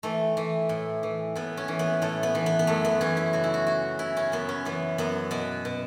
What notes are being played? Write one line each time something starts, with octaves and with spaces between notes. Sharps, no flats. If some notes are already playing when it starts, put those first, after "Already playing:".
E3 A3
E3
A2
E3
A2 B3
C#4
E3
B3
A2 A3
B3
E3
B3
B3
F#2 A3
B3
E3 C#4
E4
C#3 F#4
E4
F#4
C#3 F#4
C#3 E4
C#4
F#2 B3
C#4
E3 B3
F#2 B3
B2 B3
B2